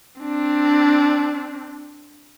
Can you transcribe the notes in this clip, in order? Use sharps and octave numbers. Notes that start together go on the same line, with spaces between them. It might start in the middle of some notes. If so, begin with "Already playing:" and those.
C4 D4